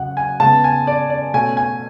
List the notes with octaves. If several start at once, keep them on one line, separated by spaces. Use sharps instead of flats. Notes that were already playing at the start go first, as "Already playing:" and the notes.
Already playing: F#2 C#3 F#5
G#5
C#3 G#3 B3 A5
G#5
D5
D5
B2 A3 C#4 G#5
G#5